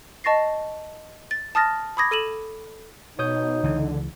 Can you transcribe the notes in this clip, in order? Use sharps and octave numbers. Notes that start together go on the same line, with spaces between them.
D#5 A5 C#6 A6 A#6 C7
A6
A5 D#6 F6 A6 A#6
B5 D6 D#6 G#6 A#6
A4 D#7 E7 F#7
B2 D#4 C#5 D#6 G6
C#2 D3 E3